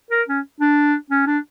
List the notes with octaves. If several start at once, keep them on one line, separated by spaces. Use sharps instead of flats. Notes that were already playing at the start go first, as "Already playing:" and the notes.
A#4
C#4
D4
C#4
D4